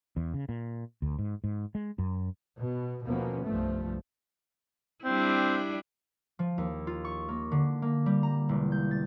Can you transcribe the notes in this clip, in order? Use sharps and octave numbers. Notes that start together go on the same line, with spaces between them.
E2
C#3
A#2
D2
G#2
G#2
G#3
F#2
B2
D#2 B2 F3 A#3 B3 C#4
C2 G2 F3 A3
G3 C4 D4 E4
F3
D#2
F4
C#6
A#3
D3
A#3
G3
A#5
E1
G6
A6